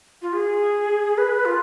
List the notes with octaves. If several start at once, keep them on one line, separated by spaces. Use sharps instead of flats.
F4
G#4
B4
F4